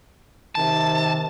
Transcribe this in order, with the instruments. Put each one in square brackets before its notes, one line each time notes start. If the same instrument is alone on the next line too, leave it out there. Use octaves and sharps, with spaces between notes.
[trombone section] C3 D#3 [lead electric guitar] A5